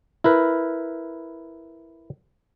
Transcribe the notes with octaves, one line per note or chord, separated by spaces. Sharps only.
E4 A#4 B4